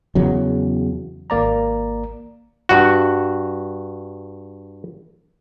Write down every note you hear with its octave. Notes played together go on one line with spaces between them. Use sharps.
E2 C#3 F#3
G#1 A#3 D5 A#5
G2 F#4